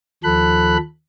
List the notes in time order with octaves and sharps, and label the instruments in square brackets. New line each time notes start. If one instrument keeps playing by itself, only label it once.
[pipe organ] D#2 F3 A4 B5 F#6